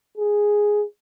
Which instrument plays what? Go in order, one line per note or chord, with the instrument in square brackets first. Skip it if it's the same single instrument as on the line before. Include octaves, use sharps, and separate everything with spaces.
[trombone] G#4